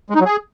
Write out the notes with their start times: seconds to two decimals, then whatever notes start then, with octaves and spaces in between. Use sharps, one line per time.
0.10 G#3
0.15 D#4
0.20 F#3
0.25 G#4